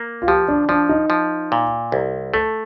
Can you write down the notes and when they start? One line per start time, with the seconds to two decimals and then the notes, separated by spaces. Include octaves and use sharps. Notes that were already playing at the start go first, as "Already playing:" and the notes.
Already playing: A#3
0.22 F4
0.27 F3 G4
0.48 D4
0.69 F3 D4
0.89 D#4
1.10 F3
1.52 A#2
1.92 C2
2.33 A3 A4